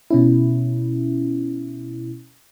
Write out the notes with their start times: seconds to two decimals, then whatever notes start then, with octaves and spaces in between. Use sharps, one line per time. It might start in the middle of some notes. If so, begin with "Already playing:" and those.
0.10 B2 C#4 E4